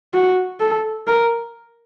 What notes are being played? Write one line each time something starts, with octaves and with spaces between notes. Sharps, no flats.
F#4
A4
A#4